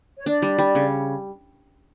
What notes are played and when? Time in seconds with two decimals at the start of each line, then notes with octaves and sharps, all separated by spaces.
0.17 C#5
0.26 D4 D5
0.42 G3
0.58 G3
0.75 C#3